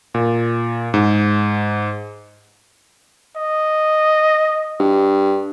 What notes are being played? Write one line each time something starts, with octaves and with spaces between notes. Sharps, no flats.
A#2
G#2
D#5
G2